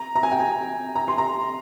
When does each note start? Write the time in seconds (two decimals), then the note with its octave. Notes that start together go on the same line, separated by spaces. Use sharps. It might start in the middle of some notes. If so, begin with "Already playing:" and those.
Already playing: A#5
0.15 A#5
0.23 G#5
0.32 G5
0.39 G#5
0.95 A#5
1.08 C6
1.18 A#5